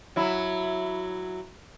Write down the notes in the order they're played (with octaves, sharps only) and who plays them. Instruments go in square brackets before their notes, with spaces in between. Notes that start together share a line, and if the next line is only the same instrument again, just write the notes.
[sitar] F#3 E4